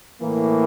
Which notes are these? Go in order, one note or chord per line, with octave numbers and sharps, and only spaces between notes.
A2 E3 A#3